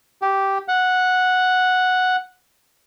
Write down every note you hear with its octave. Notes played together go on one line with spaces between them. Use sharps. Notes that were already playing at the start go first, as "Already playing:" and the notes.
G4
F#5